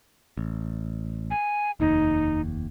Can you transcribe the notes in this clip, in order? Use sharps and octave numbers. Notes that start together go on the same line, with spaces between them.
A1
G#5
F1 D#2 D#4